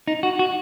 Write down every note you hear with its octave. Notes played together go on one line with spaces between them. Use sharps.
D#4
F#4
F#4